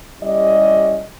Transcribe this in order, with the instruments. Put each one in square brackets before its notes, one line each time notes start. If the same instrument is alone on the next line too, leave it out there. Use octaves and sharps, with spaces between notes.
[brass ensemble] G3 C#4 E4 G4 D5 D#5